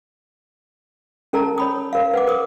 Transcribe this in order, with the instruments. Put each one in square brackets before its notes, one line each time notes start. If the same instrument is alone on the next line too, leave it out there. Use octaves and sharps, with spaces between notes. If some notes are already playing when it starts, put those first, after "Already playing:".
[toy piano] C#4 A4 A#4 A5 A#5
C#5 B5 D#6
A#4 F5
B4 F#5 D6
A#4 D#6